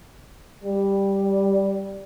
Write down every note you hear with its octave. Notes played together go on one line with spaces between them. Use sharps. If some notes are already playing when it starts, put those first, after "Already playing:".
G3